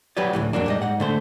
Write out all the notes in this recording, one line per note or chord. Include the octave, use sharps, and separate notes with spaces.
F#3 G4 B4 C#5 D5
D2 A2 E3
F2 F#3 A#3 D4
G#2 G3 D#5
G#2 F#5
D3 A3 C5